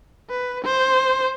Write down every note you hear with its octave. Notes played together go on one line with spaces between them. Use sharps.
B4
C5